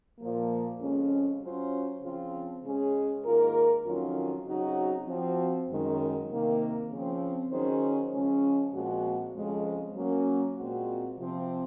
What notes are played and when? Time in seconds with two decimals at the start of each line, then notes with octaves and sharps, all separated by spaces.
0.19 A#2 F3 A#3
0.80 F2 C#3 G#3 C#4
1.41 F#3 C#4 F4 C5
2.02 C#3 F3 C4 F4
2.63 C#3 G#3 C#4 G#4
3.24 G#2 D#3 A#3 F4 A#4
3.85 F2 D#3 F#3 C#4 F4
4.46 C#3 F#3 C4 D#4 F#4
5.07 F3 C4 F#4
5.69 F#2 D#3 G#3
6.29 C3 D#3 A#3
6.90 C#3 F3 C4
7.51 D#3 F#3 C#4 G#4 C5
8.12 C#3 F3 G#3 C#4
8.73 A#2 F3 G#3 C4 F#4
9.34 F2 C#3 F3 G#3
9.95 F#3 A#3 C#4
10.56 A#2 G#3 C4 F#4
11.18 C3 F3 C4